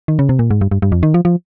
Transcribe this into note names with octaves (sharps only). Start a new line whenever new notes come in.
D#3
C#3
C3
A#2
G#2
G2
G2
G2
F2
D#3
F3
F3